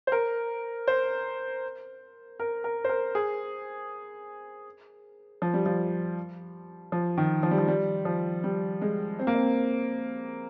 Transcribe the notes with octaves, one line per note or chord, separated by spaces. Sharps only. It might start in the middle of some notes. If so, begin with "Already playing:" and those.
C5
A#4
C5
A#4
A#4
C5
A#4
G#4
F3
G3
F3
F3
D#3
F3
G3
F3
G3
F3
G3
G#3
C4
A#3
C4